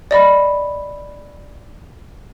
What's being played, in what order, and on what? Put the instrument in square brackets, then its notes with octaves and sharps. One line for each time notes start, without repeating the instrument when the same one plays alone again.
[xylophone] D5 D#5 B5